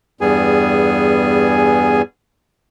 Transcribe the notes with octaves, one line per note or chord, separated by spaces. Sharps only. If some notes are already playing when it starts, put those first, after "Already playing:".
E2 G2 G3 B3 G#4 G#5